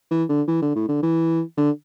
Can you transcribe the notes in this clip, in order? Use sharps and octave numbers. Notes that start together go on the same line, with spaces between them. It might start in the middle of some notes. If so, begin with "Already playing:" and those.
E3
D3
E3
D3
A2
D3
E3
D3